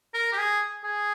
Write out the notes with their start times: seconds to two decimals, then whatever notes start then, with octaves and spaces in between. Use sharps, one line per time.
0.14 A#4
0.33 G4
0.38 G#4
0.84 G#4